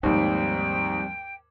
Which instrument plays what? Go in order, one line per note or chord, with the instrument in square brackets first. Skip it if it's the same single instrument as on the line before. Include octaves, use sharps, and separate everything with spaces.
[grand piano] D#2 G#2 [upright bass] F3 D#4 [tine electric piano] G3 C4 [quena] G5